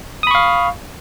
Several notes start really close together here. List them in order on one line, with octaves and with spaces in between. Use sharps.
D#6 B5 C#6 F5